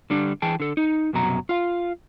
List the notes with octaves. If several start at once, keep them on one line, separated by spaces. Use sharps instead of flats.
D3 G3 D4
E3 G#4 G5 A5
D3 A4
D#4
C2 F#2 B2 F#3 A#5
F4 F5